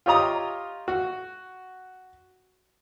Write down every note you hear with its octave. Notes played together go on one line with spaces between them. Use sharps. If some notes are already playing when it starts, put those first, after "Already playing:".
F4 G4 C#5 D#5 A#5 D#6
F#4